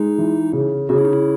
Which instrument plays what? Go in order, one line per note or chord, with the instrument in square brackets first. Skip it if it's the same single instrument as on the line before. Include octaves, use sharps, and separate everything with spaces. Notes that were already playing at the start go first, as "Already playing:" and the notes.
Already playing: [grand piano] G#3 [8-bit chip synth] D#4
[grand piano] E3
C#3
[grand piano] C#3 [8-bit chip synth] F#4
[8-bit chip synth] E4
D#4
E4